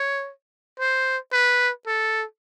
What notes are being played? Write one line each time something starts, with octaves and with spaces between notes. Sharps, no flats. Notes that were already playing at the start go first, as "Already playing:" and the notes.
Already playing: C#5
C5
B4
A4